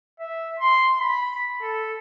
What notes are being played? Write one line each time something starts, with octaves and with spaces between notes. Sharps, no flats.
E5
C6
B5
A4